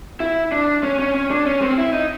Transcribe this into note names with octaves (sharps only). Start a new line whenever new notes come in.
E4
D4
C#4
C#4
C#4
D4
C#4
C4
E4
D#4